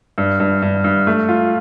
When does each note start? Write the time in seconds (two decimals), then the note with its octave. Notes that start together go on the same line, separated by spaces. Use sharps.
0.18 G2
0.40 G2
0.62 G2
0.84 G2
1.07 A3
1.29 F4